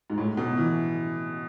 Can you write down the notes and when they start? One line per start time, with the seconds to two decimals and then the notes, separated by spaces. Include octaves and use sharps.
0.10 G#2
0.18 A2
0.37 B2
0.57 E3